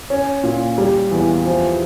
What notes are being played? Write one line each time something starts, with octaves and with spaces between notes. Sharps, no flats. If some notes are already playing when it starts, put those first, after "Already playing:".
C#4
A#2
G3
E2
F3